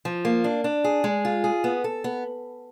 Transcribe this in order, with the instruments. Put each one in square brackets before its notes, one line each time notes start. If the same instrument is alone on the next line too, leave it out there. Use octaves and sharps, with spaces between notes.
[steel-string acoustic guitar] F3
A#3
D4
D4
G#4
G#3
F4
G#4
B3
A4
B3